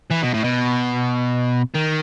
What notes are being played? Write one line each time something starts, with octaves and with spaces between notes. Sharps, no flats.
E3
B2
A2
B2
D#3